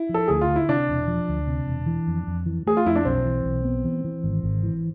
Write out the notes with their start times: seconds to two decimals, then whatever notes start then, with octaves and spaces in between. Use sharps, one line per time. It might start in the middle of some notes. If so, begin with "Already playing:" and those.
Already playing: E4
0.09 F3
0.14 A4
0.28 D2 G#4
0.41 F4
0.48 D3
0.56 E4
0.69 C3 D4
0.89 E1
1.08 F3
1.28 D2
1.48 C3
1.67 E1
1.86 E3
2.07 F2
2.27 F2
2.46 E3
2.67 A3 G#4
2.77 F4
2.86 F2 E4
2.95 D4
3.05 B1 C4
3.25 E3
3.44 B1
3.65 B3
3.84 E3
4.04 E3
4.24 G#1
4.44 G#1
4.63 E3